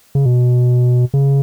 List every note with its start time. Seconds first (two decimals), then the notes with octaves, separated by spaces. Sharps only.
0.15 C#3
0.26 B2
1.14 C#3